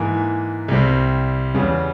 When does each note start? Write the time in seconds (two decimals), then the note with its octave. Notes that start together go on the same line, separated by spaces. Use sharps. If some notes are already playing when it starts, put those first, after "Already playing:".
Already playing: G#2 E3 A#3 G#5
0.68 C2 C3 G3 C4
1.54 E2 C#3 G3